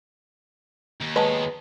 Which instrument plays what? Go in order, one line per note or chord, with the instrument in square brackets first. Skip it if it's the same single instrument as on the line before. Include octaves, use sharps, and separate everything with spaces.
[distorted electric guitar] D#2
[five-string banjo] F#3 G#3 B3 [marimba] B4 A5